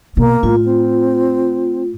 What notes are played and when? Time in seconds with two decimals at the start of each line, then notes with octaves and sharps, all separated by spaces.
0.17 B2 A#3
0.43 A2 F4
0.65 C4